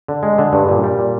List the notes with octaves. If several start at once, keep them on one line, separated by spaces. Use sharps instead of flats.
D3
G#3
D3
G2
A#2
G3
A#2